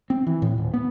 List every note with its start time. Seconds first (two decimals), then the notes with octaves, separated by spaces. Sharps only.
0.10 C4
0.27 E3
0.42 A2
0.58 D#1
0.74 B3